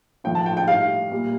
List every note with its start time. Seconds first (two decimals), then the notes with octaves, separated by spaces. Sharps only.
0.24 A2 F3 G5
0.35 A5
0.46 G5
0.57 G5
0.68 A2 G3 F5
1.11 A#2 G3